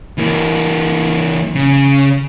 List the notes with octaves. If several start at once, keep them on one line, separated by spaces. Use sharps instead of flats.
E3 A#3
C#3